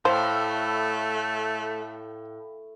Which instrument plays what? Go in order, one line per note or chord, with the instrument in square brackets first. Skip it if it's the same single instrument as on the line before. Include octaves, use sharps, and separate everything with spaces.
[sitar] A2 [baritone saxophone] A3 [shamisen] C5 [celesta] F5 G5